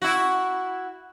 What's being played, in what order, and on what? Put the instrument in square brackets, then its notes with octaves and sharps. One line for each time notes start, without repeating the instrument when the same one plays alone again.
[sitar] E4 F#4